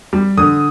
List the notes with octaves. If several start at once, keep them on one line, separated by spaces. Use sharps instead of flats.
G3
D3 D#6